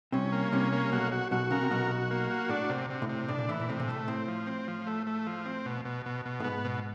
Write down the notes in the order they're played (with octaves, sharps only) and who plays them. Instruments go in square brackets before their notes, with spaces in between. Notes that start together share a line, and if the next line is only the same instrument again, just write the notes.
[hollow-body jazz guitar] C2 C3 [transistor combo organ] C#4
[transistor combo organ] A#3
[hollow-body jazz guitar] C2 C3 [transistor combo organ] C#4
[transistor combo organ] A#3
[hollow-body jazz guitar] B1 B2 [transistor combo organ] F#4
[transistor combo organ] F#4
[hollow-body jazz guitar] B1 B2 [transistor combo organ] F#4
[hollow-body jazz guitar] C#3 [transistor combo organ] A#4
[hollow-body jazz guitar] C3
[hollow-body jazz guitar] B1 B2 [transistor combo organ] F#4
[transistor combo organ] F#4
A#3
F#4
[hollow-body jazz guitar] A2 [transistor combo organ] D4
[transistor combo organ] C3
C3
[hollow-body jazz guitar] A2
[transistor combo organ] C3
[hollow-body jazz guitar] A2 [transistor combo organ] D4
[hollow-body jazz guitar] A#2
[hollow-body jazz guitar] A2 [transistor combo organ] E3
[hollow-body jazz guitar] A#2
[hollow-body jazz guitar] A2 [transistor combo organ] C3
[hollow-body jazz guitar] A#2
[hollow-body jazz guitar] A2 [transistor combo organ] A3
[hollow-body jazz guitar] A2 [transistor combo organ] C4
[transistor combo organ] F3
C4
F3
A3
A3
F3
C4
B2
B2
B2
B2
[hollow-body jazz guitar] A2
[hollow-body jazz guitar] G#2 [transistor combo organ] B3
[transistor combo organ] B2